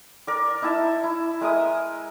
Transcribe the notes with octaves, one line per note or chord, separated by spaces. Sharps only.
A#4 D5
D#4 E4 E5 A5
E4
G#3 A#4 E5 D#6